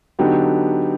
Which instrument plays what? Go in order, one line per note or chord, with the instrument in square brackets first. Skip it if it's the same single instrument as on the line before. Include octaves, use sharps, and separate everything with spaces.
[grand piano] D3 F#3 B3 D#4 G4